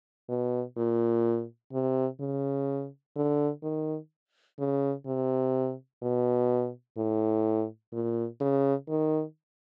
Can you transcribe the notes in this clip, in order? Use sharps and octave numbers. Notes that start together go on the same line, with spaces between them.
B2
A#2
C3
C#3
D3
D#3
C#3
C3
B2
A2
A#2
C#3
D#3